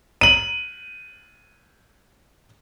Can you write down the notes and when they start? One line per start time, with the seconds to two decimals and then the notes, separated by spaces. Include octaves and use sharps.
0.21 D#7 F#7